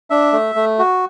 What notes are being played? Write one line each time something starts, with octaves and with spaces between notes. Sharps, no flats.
D4 E5
A3
A3
F#4